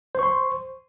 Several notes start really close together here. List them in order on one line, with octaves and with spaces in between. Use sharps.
C5 C#6 C6